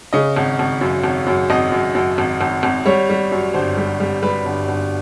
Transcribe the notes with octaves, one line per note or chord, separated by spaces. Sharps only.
C#3 D#5
G#1
G#1
F#2
G#1
F#2
G#1 D#5
F#2
F#2
G#1
G#1
G#1
G3 C#5
G3
F#2
G1 C5
G3
G3
G3 B4
G1
G1